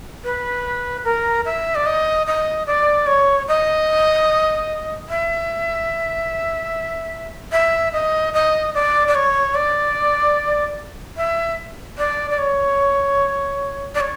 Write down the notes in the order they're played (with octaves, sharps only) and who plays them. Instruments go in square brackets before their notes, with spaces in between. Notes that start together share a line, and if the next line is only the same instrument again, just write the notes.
[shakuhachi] B4
A#4
E5
D5
D#5
D#5
D5
C#5
D#5
E5
E5
D#5
D#5
D5
D5
C#5
D5
E5
D5
D5
C#5
D5
C#5